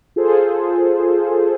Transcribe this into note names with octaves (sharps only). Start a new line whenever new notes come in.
F4 G#4 A4 C5